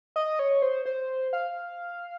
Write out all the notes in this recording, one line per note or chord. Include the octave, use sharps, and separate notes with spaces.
D#5
C#5
C5
C5
F5